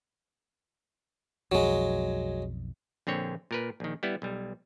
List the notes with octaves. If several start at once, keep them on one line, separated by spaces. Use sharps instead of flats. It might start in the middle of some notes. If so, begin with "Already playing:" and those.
B1 F2 F#3 G#3
A#1 D3 C4 C#5
A#2 A#4 B4
A#1 D#3
G3 B3 E4
B1 G3